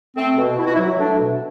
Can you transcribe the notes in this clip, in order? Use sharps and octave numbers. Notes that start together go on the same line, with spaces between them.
A3 C4
B2
B2 E4
F#4
E4
F#3
A3 D4
B2